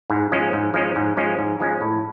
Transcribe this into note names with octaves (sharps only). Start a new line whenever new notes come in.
G#2
F3 G#3 C#4
G#2
F3 G#3 C#4
G#2
F3 G#3 C#4
G#2
F3 G#3 C#4
A2